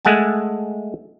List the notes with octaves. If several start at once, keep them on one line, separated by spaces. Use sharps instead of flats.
G#3 A3 F#5 G#5 A5